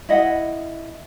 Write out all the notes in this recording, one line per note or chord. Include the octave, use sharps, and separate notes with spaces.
E4 D#5 F#5